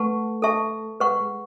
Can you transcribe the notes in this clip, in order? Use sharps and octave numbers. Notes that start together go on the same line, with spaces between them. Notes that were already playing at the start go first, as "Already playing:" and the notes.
Already playing: A3 B4 F#5 A5 C#6
A4 E5 A5 C#6
G#3 B4 F#5 C#6
G#3